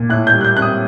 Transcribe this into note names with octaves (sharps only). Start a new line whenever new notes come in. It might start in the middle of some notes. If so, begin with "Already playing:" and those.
Already playing: A#2
A2 F#6
G6
G3
F#6
G6
C4 F#6
D#6